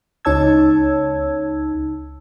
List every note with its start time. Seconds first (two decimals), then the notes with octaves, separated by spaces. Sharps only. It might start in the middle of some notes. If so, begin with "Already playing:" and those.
0.25 C#2 D#4 C#5 A5 E6 G#6